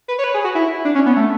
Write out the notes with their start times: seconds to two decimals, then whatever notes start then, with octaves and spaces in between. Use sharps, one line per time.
0.08 B4
0.19 C#5
0.24 B4
0.34 G#4
0.44 F#4
0.55 E4
0.85 D4
0.95 C#4
1.06 B3
1.16 A3